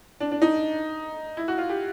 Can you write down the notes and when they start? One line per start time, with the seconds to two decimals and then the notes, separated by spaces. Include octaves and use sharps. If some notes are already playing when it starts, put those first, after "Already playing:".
0.20 D4
0.31 D4
0.42 D#4
1.37 E4
1.48 F#4
1.58 F4
1.70 G4